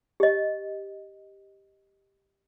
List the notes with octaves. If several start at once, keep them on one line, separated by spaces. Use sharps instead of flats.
G4 D#5